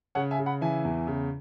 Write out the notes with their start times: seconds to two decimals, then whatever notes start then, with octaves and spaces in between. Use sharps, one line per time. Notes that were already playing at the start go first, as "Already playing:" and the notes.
0.15 C#3 C#5 F#5
0.31 E5 G#5
0.38 C#3
0.46 F#5 B5
0.61 E3 E5 G#5
0.85 E2
1.07 C#3